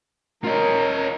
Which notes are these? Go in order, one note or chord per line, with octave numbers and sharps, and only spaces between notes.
F4 A#4 C#5 D#5